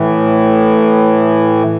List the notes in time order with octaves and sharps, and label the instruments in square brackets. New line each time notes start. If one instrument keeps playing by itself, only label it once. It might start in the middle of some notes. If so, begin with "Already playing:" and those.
Already playing: [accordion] A2 E3